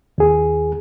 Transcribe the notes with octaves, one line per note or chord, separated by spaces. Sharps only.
D#2 G#4